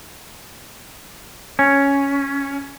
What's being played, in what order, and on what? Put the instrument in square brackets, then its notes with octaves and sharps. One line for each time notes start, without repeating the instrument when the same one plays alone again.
[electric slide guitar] C#4